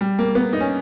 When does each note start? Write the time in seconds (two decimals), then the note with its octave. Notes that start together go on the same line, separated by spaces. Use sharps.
0.01 G3
0.19 A#3
0.35 B3
0.53 D#4
0.60 C#4